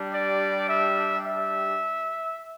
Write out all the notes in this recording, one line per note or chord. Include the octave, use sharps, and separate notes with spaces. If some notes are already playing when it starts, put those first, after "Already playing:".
Already playing: G3 D4 G4
D5
E5
E5